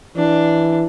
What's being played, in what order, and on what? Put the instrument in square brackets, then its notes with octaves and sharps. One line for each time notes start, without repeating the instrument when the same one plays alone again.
[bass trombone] E3 [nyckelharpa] D4